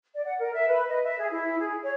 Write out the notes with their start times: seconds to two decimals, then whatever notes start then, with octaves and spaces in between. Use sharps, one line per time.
0.13 D5
0.25 F#5
0.39 A#4
0.54 E5
0.68 B4
0.89 D#5
1.03 E5
1.18 G#4
1.31 E4
1.59 G#4
1.83 C#5